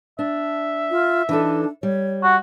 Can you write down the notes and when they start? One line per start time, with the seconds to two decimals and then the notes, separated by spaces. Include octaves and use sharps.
0.19 D4 E5
0.91 F4
1.29 E3 D4 D#4 A4
1.83 G3 C#5
2.23 F#4